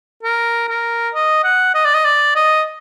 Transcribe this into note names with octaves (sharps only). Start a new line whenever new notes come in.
A#4
A#4
D#5
F#5
D#5
D5
D#5
D5
D#5